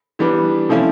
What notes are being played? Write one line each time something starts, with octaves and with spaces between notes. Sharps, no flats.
E3 G3 B3 D4
C3 F3 A3 C#4 E4